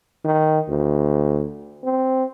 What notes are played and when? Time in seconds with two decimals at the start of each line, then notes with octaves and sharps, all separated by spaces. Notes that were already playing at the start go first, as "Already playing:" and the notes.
0.25 D#3
0.68 D2
1.84 C4